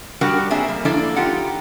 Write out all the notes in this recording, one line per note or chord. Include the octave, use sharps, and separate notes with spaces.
G3 D4 F#4 G4 A#4 F#5
A#3 C4 D4 G#4 E5
G3
F3 A#3 D4 E4 A4 D5
D#4 F4 G4 F#5